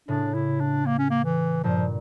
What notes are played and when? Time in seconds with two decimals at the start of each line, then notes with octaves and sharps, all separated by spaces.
0.08 A2 C#3 D4
0.34 E4
0.60 D4
0.86 A#3
0.99 C#4
1.10 A#3
1.24 E3
1.63 G2 A#2 F3